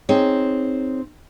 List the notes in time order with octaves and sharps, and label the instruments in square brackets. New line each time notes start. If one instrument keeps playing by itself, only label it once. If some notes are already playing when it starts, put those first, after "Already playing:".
[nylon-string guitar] C4 D#4 G#4 C#5